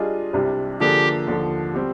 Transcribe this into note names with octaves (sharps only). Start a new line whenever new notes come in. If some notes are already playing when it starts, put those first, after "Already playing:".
Already playing: G3 D4 F4 G#4 D#5
C2 C3 G3 D4
D3 F3 A#3 D4 G4 G#4
D#2 D3 F3
G3 C4 G4